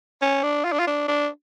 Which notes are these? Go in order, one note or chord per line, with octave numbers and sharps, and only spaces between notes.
C#4
D4
F4
D4
F4
D4
D4